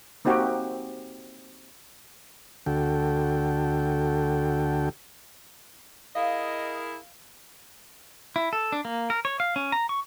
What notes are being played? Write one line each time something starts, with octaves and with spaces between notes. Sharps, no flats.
A#3 C4 D#4 F#4 G4
D2 D3 F#4 A4 G5
E4 G#4 A#4 D#5 F5
E4
A4
D4
A#3
A#4
C#5
F5
C#4
A#5
C#6